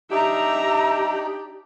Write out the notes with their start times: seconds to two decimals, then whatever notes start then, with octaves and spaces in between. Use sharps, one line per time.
0.11 D4 D#4 G4 E5 A#5